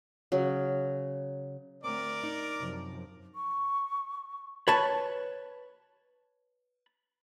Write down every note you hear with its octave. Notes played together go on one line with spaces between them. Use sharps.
C#3 F#3
D2 C4 A#4 D5 D6
D#4
F#2 C3 F3
C#6
B4 C#5 A5